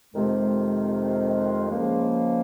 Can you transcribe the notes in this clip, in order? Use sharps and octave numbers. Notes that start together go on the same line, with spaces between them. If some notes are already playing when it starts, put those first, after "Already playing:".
F2 C3 D#3 G#3
C#2 C#3 F3 A#3